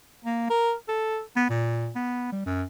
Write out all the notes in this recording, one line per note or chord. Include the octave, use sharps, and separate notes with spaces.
A#3
A#4
A4
B3
A#2
B3
G3
F#2